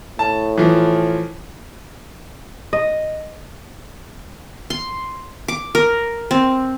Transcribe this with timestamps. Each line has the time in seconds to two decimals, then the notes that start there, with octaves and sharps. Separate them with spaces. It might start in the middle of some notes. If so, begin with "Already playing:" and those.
0.19 A2 A5
0.58 E3 F3
2.73 D#5
4.70 C6
5.48 D6
5.75 A#4
6.31 C4